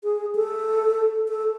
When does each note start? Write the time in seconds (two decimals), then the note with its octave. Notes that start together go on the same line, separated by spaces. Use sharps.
0.04 G#4
0.35 A4
1.28 A4